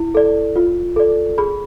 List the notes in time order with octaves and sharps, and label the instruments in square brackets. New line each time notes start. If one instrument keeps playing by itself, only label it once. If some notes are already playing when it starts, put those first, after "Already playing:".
Already playing: [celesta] E4
A4 D5
F4
A4 D5
G#4 B5